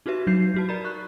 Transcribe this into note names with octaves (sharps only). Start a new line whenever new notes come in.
D#4 F#4 G4 B4 E5
F#3 D#4 G6 C7
F#3 F#4 A5
A#4 D5 A#5 B5
C#6 F#6